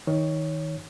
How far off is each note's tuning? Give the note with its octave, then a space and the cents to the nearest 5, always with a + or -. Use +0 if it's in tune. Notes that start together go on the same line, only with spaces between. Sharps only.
D#3 +20 C#5 +5